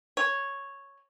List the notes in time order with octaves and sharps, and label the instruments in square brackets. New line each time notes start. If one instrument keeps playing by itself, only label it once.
[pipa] C#5